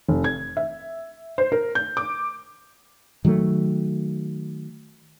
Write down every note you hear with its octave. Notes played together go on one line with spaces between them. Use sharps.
F1
G#6
E5
C5
A#4
G6
D6
D#3 F#3 G#3 A3